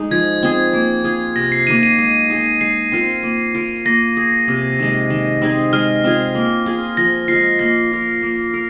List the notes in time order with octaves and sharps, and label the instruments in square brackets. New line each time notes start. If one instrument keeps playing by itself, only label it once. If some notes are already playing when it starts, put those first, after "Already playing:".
Already playing: [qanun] G#3 D#4
[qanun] F3 [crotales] G#6
[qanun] C4 G#4
A#3
F4 G#4
[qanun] C3 [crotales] A#6
[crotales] C7
[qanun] D#3 A#3 [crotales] D#7
[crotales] D#7
[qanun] G#3
D#4 G#4
[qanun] G#3 [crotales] C7
[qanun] C4 F4 A#4
A#3
F4 A#4
[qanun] A#3 [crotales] A#6
[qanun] G#4
C3
D#3 G#3
D#3
C4 D#4 G#4
[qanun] G#3 [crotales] F6
[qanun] C4 F4 G#4
A#3
F4 G#4
[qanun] F3 [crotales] A#6
[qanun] G#3 F4 [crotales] C7
[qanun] A#3 [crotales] A#6
[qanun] F4 A#4
A#3
A#4